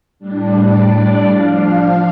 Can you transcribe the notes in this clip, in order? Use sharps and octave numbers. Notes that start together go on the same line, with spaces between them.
A2 G3 D4
D5
F3 D4 F5